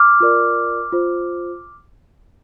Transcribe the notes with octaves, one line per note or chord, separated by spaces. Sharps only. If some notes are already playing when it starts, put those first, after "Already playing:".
Already playing: D6 F6
F4 A#4 D5
F4 C5